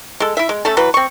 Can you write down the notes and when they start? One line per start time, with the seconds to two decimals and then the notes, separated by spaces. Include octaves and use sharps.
0.20 G#3 A4
0.37 E4 E5
0.49 G#3
0.65 A3 C#4 A4
0.77 E3 F#3 B4
0.94 C4 C#6